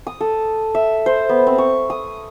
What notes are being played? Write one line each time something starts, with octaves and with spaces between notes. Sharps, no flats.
D#6
A4
E5
C5
B3
C4
C#6
D#6